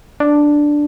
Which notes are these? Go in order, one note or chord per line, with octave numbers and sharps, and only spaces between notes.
D4